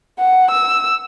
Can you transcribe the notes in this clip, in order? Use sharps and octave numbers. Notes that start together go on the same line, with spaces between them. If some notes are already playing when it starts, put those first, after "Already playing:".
F#5
E6